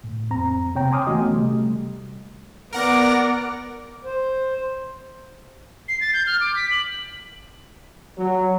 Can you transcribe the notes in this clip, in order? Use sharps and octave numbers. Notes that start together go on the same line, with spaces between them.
A2
F2 C4 A#5
C3 C4 C#5 G5 A#5
G#5 C6 D6 D#6 F6
E3 A3 B3 C#4 F#4 D#5
C3 G3 A3
B3 A#4 D5 F#5 A#6
C5
C7
A6
G6
F6
D6
B6
F#7
F#3